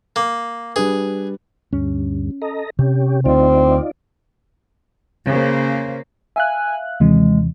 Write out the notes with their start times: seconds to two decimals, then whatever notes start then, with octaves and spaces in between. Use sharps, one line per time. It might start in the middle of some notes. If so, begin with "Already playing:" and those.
0.16 A#3
0.76 G3 D4 G#4 B4
1.73 D2 G2 C#4
2.42 A4 D#5 A#5
2.79 C3 C#4 G4
3.25 D2 C4 D#4 F4 D5
5.29 C#3 A#3 C5
6.36 E5 F5 G#5 F#6
7.00 D#2 C3 E3 G#3